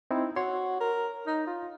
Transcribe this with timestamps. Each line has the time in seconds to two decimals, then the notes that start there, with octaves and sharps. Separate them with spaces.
0.11 C4 D#4 E4
0.36 F#4 C#5 C6
0.80 A#4
1.27 D#4
1.47 F4